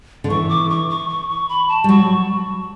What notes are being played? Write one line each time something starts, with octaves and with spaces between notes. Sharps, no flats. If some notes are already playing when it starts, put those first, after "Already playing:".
D3
E3 C#6
D6
C#6
C#6
C#6
C#6
B5
A5
G3
F#3 C#6